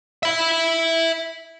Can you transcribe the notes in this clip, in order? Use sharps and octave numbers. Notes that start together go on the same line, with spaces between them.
E5 B5